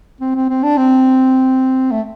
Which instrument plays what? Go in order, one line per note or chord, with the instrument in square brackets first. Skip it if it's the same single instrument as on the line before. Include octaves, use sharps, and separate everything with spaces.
[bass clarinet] C4
C4
C4
D4
C4
A3